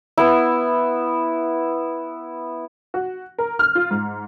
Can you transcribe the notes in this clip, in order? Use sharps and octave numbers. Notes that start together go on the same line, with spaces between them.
B3 E4
F#4
A#4
F6
F4
G#2